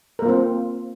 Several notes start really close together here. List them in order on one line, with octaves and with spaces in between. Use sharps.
A#4 A#3 F4 C4